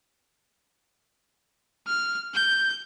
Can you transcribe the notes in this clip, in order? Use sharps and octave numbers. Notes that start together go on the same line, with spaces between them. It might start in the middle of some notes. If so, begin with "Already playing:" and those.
F6
G6